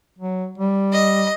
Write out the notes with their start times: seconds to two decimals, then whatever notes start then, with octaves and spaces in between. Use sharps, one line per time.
0.19 F#3
0.58 G3
0.94 D#5